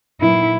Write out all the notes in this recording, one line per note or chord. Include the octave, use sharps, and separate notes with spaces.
A#2 F#3 B3 D#4 E4